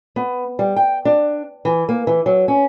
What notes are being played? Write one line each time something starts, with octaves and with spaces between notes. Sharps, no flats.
B3
G3
G5
D4
E3
A#3
E3
F#3
C#4